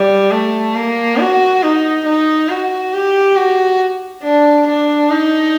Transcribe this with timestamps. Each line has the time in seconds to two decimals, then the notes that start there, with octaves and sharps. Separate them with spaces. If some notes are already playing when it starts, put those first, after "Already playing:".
Already playing: G3
0.31 A3
0.75 A#3
1.18 F#4
1.63 D#4
2.05 D#4
2.49 F#4
2.93 G4
3.36 F#4
4.23 D4
4.67 D4
5.10 D#4